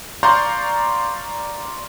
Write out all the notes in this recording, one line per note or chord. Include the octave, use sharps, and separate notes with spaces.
D5 F5 A#5 C6 C#6 G6